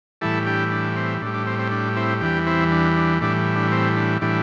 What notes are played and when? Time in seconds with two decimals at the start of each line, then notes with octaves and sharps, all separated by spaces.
0.21 A2 E3 G3 E4 A4
0.46 D4 G4
0.72 D4
0.96 C4
1.22 A2 D4
1.26 G3
1.34 D4
1.47 C4
1.59 C4
1.71 D4
1.96 C4 E4
2.21 E2 E3 G3 D4 G4
2.47 C4 E4
2.71 D4
2.97 D4
3.21 A2 E3 G3 D4
3.56 D4
3.71 C4
3.96 D4
4.21 A2 E3 G3 D4